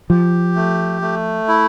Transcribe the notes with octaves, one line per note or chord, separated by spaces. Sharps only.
F3 G4
A3
A3
E4